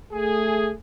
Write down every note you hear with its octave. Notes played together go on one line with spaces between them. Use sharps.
A3 G#4